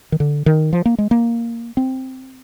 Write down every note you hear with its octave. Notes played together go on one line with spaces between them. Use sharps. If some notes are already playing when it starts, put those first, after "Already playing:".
D#3
D3
D#3
F3
A#3
G#3
A#3
C4